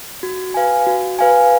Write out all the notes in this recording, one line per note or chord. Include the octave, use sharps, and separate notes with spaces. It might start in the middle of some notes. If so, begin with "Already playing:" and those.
F#4
B4 F5 G#5
F#4
B4 F5 G#5